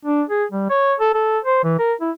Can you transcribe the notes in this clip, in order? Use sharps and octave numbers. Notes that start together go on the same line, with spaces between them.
D4
G#4
G3
C#5
A4
A4
C5
E3
A#4
E4